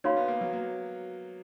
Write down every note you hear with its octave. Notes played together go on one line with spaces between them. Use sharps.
A#3 D#4 F#4 C#5 F5 B5
B3
A#3
F#3
A#3